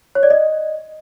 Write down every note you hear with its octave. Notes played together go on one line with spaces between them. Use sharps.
C#5
D5
D#5